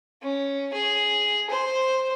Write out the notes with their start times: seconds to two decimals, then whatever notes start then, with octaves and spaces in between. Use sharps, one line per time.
0.22 C#4
0.73 G#4
1.49 C5